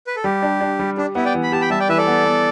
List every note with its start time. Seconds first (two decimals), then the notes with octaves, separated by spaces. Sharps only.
0.07 B4
0.16 A4
0.24 G3 G4
0.42 D4
0.61 D4
0.79 G3
0.97 D4 G4
1.15 B3 E4
1.25 D5 G5
1.34 E3
1.43 B5
1.52 G4 A5
1.61 G5 B5
1.70 G3 E5 A5
1.80 D5 G5
1.89 E3 B4 E5
1.97 A4 D5
2.07 B3
2.25 B3